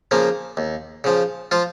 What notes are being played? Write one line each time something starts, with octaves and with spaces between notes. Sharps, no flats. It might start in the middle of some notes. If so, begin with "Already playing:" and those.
C#3 F3 A#3
D#2
C#3 F3
F3 F4